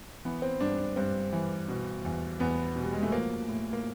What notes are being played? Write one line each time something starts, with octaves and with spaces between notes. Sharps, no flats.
E3 B3
C4
G2 D4
D4
G2 C4
E3
B2
E2
E2 B3
B2
G3
G#3
A3
F3 A#3
A2
A#3